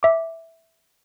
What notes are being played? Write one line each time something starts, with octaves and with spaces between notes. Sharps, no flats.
E5 D6